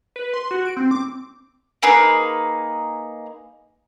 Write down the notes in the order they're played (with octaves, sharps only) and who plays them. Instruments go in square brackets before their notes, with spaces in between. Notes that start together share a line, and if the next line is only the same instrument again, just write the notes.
[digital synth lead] B4
C6
F#4
D7
C4
D6
[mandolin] A#3 D#4 G#4 B4